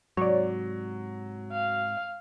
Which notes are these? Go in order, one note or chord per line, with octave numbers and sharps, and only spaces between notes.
G#2 C3 F#3 C#5 D5
F5